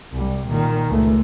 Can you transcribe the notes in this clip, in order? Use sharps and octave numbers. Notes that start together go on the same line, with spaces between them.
C2 G3
A#2 D#3
C#2 A3